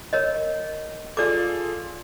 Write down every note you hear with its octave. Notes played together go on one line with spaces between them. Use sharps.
A#4 C#5 D#5
F4 G#4 A4 D5 D6